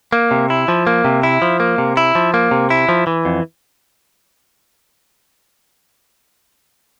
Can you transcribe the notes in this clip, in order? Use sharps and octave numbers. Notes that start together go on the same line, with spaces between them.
A#3
C3
E4
F3
A#3
C3
E4
F3
A#3
C3
E4
F3
A#3
C3
E4
F3
E3
F2